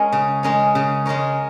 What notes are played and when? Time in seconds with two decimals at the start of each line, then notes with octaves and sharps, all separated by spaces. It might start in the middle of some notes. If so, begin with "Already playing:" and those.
Already playing: G#3 C#4 A#4 C#5
0.13 C#3
0.43 G#3 C#4 A#4 C#5
0.75 C#3
1.06 G#3 C#4 A#4 C#5